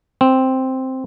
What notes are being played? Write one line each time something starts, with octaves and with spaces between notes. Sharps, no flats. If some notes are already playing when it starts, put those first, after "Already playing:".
C4